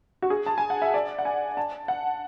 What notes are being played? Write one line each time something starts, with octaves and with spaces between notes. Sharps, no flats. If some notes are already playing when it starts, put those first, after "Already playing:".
F#4
G#4
A5
G#5
F#5
E5
D5
F#5
G#5
A5
F#5